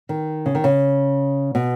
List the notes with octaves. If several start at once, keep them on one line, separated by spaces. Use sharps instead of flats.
D#3
C#3
D#3
C#3
B2